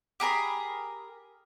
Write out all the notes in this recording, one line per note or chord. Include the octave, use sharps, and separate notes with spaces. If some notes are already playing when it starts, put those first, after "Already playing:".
G4 G#4 A#4 B5